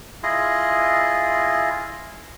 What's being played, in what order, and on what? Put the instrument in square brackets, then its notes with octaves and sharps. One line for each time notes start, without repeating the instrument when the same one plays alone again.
[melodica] E4 F4 G#4 D#5